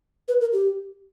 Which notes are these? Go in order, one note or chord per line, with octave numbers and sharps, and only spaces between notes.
B4
A#4
G4